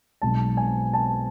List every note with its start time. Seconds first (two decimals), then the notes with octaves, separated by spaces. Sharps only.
0.22 B1 B2 G#3 A5
0.57 G#5
0.93 A5